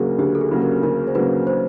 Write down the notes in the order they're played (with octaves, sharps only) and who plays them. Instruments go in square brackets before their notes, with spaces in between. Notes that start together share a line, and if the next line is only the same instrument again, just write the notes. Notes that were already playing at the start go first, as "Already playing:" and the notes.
Already playing: [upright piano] D2 C#3 F#3 A#3 [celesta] G#4 A#4
[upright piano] D2 [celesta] G4
[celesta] A4
G#4
[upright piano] C#3 F#3 A#3
[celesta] A#4
[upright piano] D2 [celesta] A#4
[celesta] C5
[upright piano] C#3 F#3 A#3 [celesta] B4
[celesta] C5